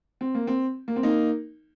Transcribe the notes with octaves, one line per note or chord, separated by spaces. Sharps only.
C4
A#3
C4
A#3
C4
A#3 D#4